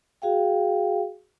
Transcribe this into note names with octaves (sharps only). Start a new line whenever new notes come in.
F#4 G#4 F5 G5